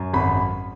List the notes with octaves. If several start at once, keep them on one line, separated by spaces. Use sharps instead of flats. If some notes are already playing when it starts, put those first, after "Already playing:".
Already playing: F#2
G#1 B5